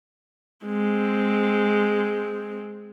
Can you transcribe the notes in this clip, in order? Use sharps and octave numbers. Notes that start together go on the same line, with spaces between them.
G#3 C4